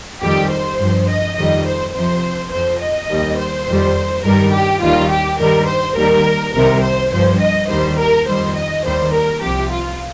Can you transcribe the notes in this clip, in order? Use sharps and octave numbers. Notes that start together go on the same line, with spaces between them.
F2 D#3 G3 G4
C5
G2 F3
D#5
F2 D#3 G3 D#5
C5
F2 C3 F3 C5
F2 F3 C5
D#5
D#2 D#3 G3
C5
F2 D#3 G3
G2 D#3 G3 A#4
G4
D#2 D#3 G3 F4
G4
G2 D#3 G3 A#4
C5
D#2 D#3 G3 A#4
C2 C3 D#3 G3 A#4
C5
G2 F3 C5
D#5
D#2 D#3 G3 C5
A#4
F2 D#3 G3 C5
D#5
D#2 D#3 G3 C5
A#4
C2 C3 F3 G4
F4